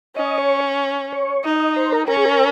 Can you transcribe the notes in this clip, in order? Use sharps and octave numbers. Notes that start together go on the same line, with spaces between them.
C#4 D#5
C#5
C#5
D#4 D#5
D#5
C5
A#4
C#4 A#4
G#4
A#4